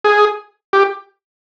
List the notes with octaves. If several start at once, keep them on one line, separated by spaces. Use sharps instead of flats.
G#4
G4